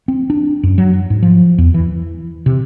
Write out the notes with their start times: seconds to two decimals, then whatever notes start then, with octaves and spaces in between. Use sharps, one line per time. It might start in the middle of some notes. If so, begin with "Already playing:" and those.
0.08 C4
0.30 D4
0.63 F#2
0.78 F#3
1.10 G#2
1.23 F3
1.58 E2
1.74 E3
2.46 C3